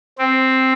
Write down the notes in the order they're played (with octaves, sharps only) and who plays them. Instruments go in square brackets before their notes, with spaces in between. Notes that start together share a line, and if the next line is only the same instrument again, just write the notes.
[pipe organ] C4